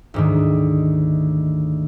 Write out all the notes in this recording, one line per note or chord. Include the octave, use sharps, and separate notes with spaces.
D2 G#2 D#3